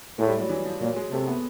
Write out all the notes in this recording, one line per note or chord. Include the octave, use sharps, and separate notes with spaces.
A2 G#3
G3
F#3
E3
F3
A#2 F#3
G#3
C3 A3
B3